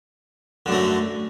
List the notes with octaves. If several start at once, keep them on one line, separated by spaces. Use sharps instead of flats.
F#2 D3 A3